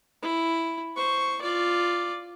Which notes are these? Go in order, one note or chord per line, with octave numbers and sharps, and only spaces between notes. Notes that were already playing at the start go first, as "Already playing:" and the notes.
E4
C5 C#6
F4 D5